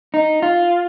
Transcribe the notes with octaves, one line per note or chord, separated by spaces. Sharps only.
D#4
F4